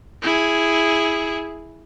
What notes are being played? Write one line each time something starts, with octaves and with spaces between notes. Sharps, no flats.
E4 G#4